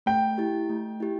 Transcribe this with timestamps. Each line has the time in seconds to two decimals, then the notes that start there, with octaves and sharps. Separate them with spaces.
0.06 A3 G5
0.38 E4 G4
0.69 A3
1.00 E4 G4